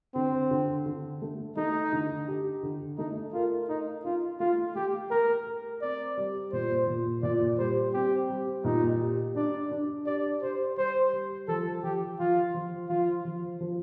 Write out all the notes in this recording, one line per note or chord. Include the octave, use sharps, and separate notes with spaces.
D3 C4
D3
D3
A3
A3 D#4
D3
G4
D3
A3 D#4
F4 A#4
D#4 D#5
D#4 F4
A3 F4
A3 G4
A3 A#4
A#4
C4 D5
G3
A#2 C5
A#2
A#2 D5
G3 C5
C4 G4
G3
A#2 D#4
G4
D4 D5
D4
G4 D5
G4 C5
G3 C5
G3
F3 A4
F3 G4
F3 F4
F3
F3 F4
F3
F3